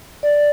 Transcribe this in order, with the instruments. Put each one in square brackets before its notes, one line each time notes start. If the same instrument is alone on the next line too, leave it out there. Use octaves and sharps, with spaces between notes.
[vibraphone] D5